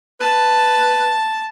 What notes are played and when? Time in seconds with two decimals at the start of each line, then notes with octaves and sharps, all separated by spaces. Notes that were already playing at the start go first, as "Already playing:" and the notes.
0.21 B4 A5